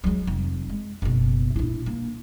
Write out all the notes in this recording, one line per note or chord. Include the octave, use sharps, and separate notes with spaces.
F#3 G#3
F1 C4
G#3
F#1 B2
A#1 E4
A#3